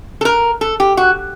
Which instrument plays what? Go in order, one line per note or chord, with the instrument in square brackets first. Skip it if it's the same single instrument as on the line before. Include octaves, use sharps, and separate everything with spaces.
[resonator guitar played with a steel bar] A4
A#4
A4
G4
F#4